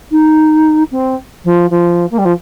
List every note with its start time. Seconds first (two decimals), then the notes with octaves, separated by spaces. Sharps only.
0.11 D#4
0.91 C4
1.44 F3
1.70 F3
2.10 A#3
2.18 G3
2.25 F3